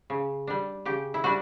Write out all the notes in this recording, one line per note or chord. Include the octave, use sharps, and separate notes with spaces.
C#3
G3 D4
C#3 G4
E4
G3 D4 F#4